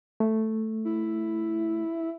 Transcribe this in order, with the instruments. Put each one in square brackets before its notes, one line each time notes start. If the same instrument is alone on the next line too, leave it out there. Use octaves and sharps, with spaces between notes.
[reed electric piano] A3
[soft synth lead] E4